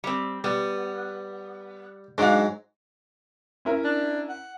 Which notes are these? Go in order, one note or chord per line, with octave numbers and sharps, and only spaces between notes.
G3 C4
G3 B3
G#2 F#3 D4 F5
C#4 E4 A#4
D4
F#5